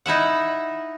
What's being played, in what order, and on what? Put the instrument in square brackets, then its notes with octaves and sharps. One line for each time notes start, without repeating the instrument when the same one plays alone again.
[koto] D#4 E4 E5 F#5